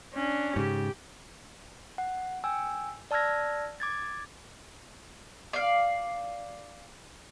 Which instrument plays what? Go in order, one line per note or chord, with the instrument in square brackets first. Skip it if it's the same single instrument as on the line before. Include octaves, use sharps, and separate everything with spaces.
[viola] C#4 D4
[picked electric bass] G#2 C#3 [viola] G4
[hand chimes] F#5
G5 G#5 E6
D5 A5 E6 F6 G#6 A#6
D6 G#6 A6
[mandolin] D5 F5